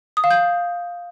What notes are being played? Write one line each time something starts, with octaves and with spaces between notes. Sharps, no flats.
D#6
F5
G6